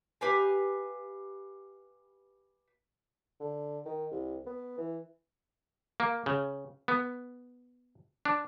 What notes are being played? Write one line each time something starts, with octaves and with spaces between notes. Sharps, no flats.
G4 B4 F5 G#5
D3
D#3
C2
B3
E3
A#3
C#3
B3
D4